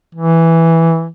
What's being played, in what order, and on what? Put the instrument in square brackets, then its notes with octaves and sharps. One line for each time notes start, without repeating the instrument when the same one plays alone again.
[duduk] E3